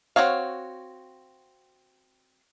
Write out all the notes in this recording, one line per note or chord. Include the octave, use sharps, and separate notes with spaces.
C4 D#4 F#4 C#5 F5